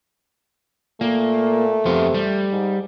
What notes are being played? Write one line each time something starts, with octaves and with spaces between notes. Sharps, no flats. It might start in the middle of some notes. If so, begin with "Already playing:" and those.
A#2 A3 A#3
F2 C3 B3 F4
G3
G#2